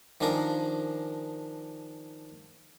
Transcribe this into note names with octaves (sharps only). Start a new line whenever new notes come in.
D#3 F3 D4 G#4 A#4